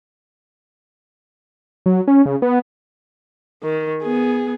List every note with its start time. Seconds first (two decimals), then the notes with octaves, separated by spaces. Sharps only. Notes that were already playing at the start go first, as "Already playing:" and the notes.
1.86 F#3
2.08 C#4
2.26 C#3
2.42 B3
3.63 D#3
4.03 B3 G#4